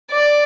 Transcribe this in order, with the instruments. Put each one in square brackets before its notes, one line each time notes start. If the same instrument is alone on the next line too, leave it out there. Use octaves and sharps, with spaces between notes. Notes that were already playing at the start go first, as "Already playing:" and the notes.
[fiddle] D5